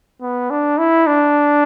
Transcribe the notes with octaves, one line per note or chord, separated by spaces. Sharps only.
B3
D4
E4
D4